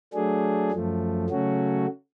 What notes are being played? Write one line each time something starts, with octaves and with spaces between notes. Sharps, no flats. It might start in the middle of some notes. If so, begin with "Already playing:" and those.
F#3 A3 D4 G#4
F#2 F3 A3
C#3 F#3 A3 C#4 F#4